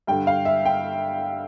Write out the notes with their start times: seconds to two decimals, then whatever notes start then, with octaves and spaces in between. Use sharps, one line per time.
0.07 G2 D3 G5
0.27 F5
0.45 E5
0.65 G5